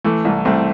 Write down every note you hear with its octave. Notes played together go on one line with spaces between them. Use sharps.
E3 A3
C2 A3
C2 A3 C4